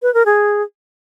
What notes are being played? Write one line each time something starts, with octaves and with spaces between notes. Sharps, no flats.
B4
A#4
G#4